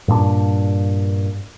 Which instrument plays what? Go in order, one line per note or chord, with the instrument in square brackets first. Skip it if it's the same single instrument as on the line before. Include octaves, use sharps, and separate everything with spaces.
[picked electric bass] G2 A#2 C4 D4